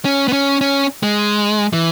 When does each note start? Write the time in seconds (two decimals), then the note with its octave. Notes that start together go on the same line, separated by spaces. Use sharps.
0.05 C#4
0.28 B3
0.33 C#4
0.61 C#4
1.03 G#3
1.73 E3